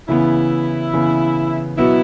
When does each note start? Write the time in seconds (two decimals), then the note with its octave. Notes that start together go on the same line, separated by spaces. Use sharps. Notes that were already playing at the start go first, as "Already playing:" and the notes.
0.08 C#3 E3 B3 E4
0.94 C#3 E3 B3
1.78 B2 F#3 B3 E4 F#4